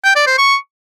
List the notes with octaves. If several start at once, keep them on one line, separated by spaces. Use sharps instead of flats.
G5
D5
C5
C#6